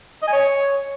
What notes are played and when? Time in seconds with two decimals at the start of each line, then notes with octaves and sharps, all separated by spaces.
0.23 D#5
0.28 G#5
0.33 C#5